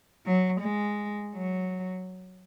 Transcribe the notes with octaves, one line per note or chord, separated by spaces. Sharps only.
F#3
G#3
F#3